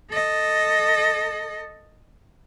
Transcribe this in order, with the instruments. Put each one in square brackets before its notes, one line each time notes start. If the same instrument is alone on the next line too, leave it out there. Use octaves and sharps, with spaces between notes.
[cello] A4 D#5